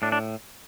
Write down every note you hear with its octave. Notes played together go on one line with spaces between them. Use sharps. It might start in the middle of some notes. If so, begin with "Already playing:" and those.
A2 D4
D4